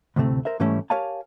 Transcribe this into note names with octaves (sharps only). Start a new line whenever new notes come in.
D2 A2 C3 A3 C4
A#4 C5 E5
G#2 E3 G3 A3 C#4 E4
G4 A#4 C#5 F5 G#5 A5